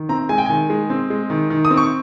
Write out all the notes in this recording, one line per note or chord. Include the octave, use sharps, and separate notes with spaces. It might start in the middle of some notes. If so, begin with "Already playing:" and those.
Already playing: D#3
C4 A#5
G#3 G#5
G5
D#3 G#5
G#3
C4
G#3
D#3
D#3
D#6
C4
C#6